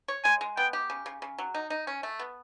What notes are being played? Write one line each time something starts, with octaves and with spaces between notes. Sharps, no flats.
C#5
G#3 G#5
G#3
B3 G5
G4
C#3
C#3
C#3
F#3
D#4
D#4
C#4
A3
B3